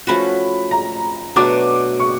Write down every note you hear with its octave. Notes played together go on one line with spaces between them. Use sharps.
F3 A3 C#4 F#4 B5
A#5
B2 F#3 A3 D4 D6
C#6